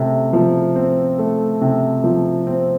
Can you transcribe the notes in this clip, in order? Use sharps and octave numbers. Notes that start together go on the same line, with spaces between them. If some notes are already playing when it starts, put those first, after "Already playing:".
Already playing: C3 A3
F3
C4
A3
C3
F3
C4